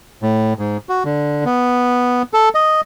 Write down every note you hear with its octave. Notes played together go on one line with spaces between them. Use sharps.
A2
G#2
F#4
D3
B3
A4
D#5